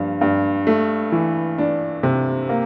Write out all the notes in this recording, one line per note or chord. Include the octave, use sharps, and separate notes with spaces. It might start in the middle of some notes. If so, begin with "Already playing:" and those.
Already playing: G2 F3
G2
A3
E3
D4
C3
A#3